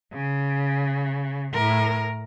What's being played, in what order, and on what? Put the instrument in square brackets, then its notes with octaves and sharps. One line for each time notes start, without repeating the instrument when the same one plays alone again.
[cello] C#3
A2 A#4